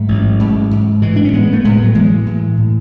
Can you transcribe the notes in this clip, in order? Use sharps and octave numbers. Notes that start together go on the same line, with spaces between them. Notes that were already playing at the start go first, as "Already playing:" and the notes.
Already playing: G#2 F#3 A3
A1
G#2
G#2
A2 E3 G#3
D4
C#4
A2 G#3 B3
A3
A2 G#3 B3
F#3
A2 E3 G#3
A2
A2